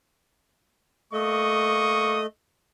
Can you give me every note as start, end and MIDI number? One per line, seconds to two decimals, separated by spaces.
1.13 2.26 57
1.13 2.21 58
1.13 2.26 75
1.13 2.21 85
1.13 2.21 87